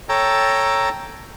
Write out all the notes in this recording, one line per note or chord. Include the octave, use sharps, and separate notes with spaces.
A4 C#5 G5 A5 A#5